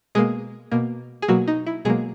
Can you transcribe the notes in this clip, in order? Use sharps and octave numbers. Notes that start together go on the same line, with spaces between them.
B2 G#3 A#3 G#4
B2 A#3
G#4
B2 F#3 A#3 F#4
D#4
E4
B2 F#3 G#3 A#3 G#4